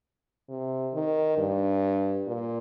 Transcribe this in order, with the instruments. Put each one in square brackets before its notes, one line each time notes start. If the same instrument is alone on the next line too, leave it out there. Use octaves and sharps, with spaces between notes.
[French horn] C3
D#3
G2
A#2